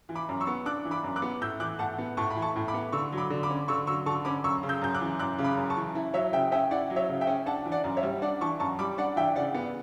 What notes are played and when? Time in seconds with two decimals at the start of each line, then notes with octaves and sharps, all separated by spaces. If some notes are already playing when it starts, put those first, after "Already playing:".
0.09 E3
0.15 B5 D6
0.29 F#2
0.41 C#6 E6
0.47 B3
0.65 D4 D6 F#6
0.85 E3
0.91 B5 D6
1.04 F#2
1.16 D6 F#6
1.22 B3
1.41 A2 E6 G6
1.60 E3 D6 F#6
1.79 A2 F#5 A5
1.98 B3
2.17 A2 A5 C#6
2.30 B5
2.36 E3
2.42 A5 C#6
2.56 A2
2.68 B5 D6
2.74 B3
2.92 D3 C#6 E6
3.12 F#3
3.17 B5 D6
3.30 D3
3.43 B5 D6
3.50 C#4
3.68 D3 C#6 E6
3.87 F#3 C#6 E6
4.06 D3 A5 C#6
4.25 C#4 B5 D6
4.44 F#2 C#6 E6
4.63 C#3
4.69 E6 G6
4.81 F#2 G6
4.94 D6 F#6
5.01 E3
5.19 F#2 D6 F#6
5.38 C#3
5.44 B5 D6
5.57 F#2
5.70 A5 C#6
5.77 E3
5.95 E4
6.14 F#3 C#5 E5
6.33 C#3 E5 G5
6.52 C#4 E5 G5
6.71 E4 D5 F#5
6.90 F#3
6.96 C#5 E5
7.09 C#3
7.21 E5 G5
7.27 C#4
7.46 D4 F#5 A5
7.65 E3
7.72 D5 F#5
7.84 F#2
7.97 C#5 E5
8.03 G3
8.22 D4 D5 F#5
8.41 E3 A5 C#6
8.60 F#2 A5 C#6
8.79 G3 B5 D6
8.98 D4 D5 F#5
9.16 E3 E5 G5
9.36 C#3 D5 F#5
9.54 B3